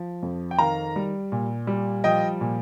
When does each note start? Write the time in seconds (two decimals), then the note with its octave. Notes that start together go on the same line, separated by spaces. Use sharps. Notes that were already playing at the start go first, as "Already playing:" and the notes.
Already playing: F3
0.22 F2
0.51 G5
0.58 D#3 F5 A#5
0.96 G3
1.32 A#2
1.67 G3
2.04 F3 D#5 G5
2.41 A#2